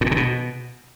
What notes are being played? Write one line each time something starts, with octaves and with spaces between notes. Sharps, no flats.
A2
A#2
C3
B2